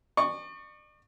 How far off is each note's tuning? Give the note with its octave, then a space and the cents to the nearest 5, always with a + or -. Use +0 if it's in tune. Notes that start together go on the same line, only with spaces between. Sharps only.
D5 +40 C#6 +0